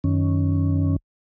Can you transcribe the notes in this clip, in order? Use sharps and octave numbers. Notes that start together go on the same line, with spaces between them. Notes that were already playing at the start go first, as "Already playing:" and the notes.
F#2 D#3 C#4